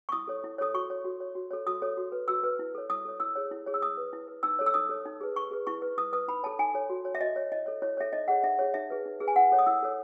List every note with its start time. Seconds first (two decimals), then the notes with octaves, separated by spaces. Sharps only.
0.09 C#6
0.12 E4 D#6
0.28 A4 C#5
0.44 E4
0.58 A4 C#5 D#6
0.74 F#4 C#6
0.90 C#5
1.05 F#4
1.20 C#5
1.35 F#4
1.50 A4 C#5
1.67 F#4 D#6
1.82 A4 C#5
1.97 F#4
2.12 B4
2.28 F#4 E6
2.44 B4
2.59 E4
2.75 A4 C#5
2.90 E4 D#6
3.05 A4 C#5
3.20 E4 E6
3.36 G#4 C#5
3.51 E4
3.66 G#4 C#5
3.74 E6
3.82 E4 D#6
3.97 B4
4.13 E4
4.28 B4
4.43 D#4 E6
4.59 A4 C#5
4.66 E6
4.74 D#4 D#6
4.89 A4 C#5
5.06 D#4
5.21 G#4 B4
5.36 D#4 C#6
5.51 G#4 B4
5.67 E4 C#6
5.82 B4
5.98 E4 D#6
6.13 B4 D#6
6.28 D#4 B5
6.43 A4 C#5 A5
6.59 D#4 G#5
6.74 A4 C#5
6.90 F#4
7.05 C#5
7.15 E5
7.21 F#4 D#5
7.36 C#5
7.52 E4 D#5
7.66 A4 C#5
7.82 E4 C#5
7.97 A4 C#5 E5
8.13 D#4 D#5
8.28 G#4 C#5 F#5
8.43 D#4 E5
8.59 G#4 C#5
8.74 D#4 E5
8.90 G#4 B4
9.05 D#4
9.20 G#4 B4
9.28 G#5
9.36 E4 F#5
9.52 A4 C#5
9.59 D#6
9.66 E4 E6
9.83 A4 C#5